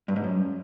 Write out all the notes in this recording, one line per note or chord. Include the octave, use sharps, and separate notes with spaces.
G2
G#2
F#2